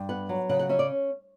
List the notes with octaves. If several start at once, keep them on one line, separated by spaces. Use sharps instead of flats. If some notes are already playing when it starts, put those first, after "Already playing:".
Already playing: G2
B3 F#5
F#3
C#3 F#5
F#5
C#4 E5
D5